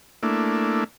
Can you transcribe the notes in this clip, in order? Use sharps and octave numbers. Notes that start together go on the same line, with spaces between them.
A3 A#3 D4 E4